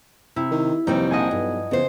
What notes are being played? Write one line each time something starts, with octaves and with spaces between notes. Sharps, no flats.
C3 E4
D#3
F1 D#2 G3 C4 D#4
A#1 D#5 F#5 G#5
B1 G2
E2 C#3 C5